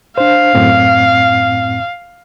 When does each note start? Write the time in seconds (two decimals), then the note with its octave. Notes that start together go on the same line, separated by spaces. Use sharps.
0.18 D4 C5 F5
0.55 F#2 A2 C4